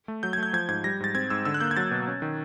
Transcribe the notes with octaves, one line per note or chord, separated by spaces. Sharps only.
A3
F#3 G6
G#6
A3 G6
F3 G#6
G#2 G#6
G3 A#6
G#2 A6
C4 G#6
G#2 E6
D3 E6
F#6
A#3 G6
G#6
F#3 A6
B2
C#4
D#3